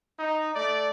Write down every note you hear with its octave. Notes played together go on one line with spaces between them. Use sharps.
D#4
A3 D5